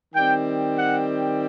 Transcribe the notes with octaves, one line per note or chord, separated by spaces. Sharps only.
D#3 G3 C4 G5
F#5